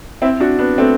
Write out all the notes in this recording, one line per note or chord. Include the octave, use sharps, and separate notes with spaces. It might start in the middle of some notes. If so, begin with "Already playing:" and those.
C4 E4
D4 F#4
B3 D4
A3 C4